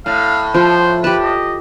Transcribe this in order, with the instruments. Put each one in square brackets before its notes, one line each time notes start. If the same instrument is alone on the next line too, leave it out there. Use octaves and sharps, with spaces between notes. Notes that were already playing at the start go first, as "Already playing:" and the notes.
[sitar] A2 [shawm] F5
[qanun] F3 F4 [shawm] C5
[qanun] G4 A5 [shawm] B4
[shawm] D#5